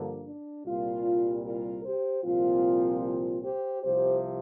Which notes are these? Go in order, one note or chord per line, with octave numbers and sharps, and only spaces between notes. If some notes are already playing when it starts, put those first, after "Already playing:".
Already playing: G2 D3 F3 A#3
D4
C2 A#2 G3 F4
F4 A#4
G4 C5
C2 A#2 F3 C4 F4
F4
G4 C5
C2 C3 F3 G4 C5